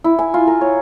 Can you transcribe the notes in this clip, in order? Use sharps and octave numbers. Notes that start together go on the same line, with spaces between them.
E4
G#5
F4
A#4
C#5